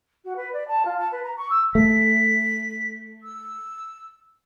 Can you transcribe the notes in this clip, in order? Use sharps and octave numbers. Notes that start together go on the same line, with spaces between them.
F#4
B4
D5
A5
F4
A5
B4
A#5
C#6
E6
A3 B6
E6